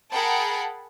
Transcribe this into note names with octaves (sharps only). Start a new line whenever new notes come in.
G#4 A#4 F#5 G5 A5 B5